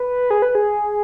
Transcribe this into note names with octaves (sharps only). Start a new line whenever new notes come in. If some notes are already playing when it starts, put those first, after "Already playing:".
Already playing: B4
G#4
B4
G#4